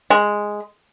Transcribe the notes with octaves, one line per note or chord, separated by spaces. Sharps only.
G#3